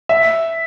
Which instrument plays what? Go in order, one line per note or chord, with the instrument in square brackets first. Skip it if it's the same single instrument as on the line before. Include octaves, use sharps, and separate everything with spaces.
[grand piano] E5